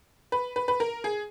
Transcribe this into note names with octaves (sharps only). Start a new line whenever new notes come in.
B4
B4
B4
A#4
G#4